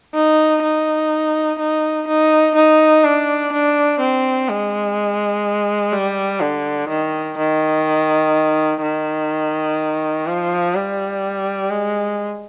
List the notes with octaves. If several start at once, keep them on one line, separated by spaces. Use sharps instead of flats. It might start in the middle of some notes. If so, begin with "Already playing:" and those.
D#4
D#4
D#4
D#4
D#4
D4
D4
C4
G#3
G3
D3
D#3
D#3
D#3
F3
G3
G#3